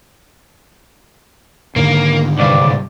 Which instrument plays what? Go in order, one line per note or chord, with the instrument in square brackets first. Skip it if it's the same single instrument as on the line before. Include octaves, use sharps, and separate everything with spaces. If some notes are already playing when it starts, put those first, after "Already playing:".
[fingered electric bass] G#2 D3 D#3 [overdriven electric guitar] A#3
[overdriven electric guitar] C2 G2 [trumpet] D5